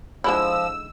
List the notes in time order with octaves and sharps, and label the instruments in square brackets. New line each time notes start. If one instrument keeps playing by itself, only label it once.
[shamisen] D3 G#3 E4 [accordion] F3 [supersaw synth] E6